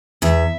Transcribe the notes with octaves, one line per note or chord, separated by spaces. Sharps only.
E2 E5